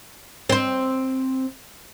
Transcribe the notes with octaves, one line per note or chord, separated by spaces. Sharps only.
C4 C5